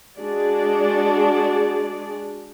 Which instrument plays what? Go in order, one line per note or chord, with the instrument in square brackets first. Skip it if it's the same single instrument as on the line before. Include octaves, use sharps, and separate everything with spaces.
[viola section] G#3 D4 F#4 G#4 D5